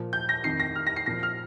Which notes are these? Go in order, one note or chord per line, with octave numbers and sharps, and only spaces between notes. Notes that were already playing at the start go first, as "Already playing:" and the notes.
Already playing: A#2 F3
G6
A#6
F2 D#3 C7
A#6
F6
A#6
C7
A#2 F3 A#6
F6